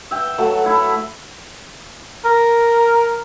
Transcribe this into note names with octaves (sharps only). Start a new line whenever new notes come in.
E5 G5
F#3 A3
A3 E4
A#4